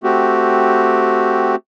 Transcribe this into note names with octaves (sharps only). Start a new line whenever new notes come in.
A3 C4 F#4 G4